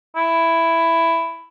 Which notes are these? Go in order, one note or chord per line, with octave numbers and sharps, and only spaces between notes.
E4